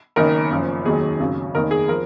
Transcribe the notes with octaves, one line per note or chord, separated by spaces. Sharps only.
F#1 F#2 D#3 A#4
F#1 F#2 F3
F1 D#2 D#3 F#3 G#4
G#1 F#2 C#3 F#3
F1 D#2 D#3 A#4
G#4
F3 A#4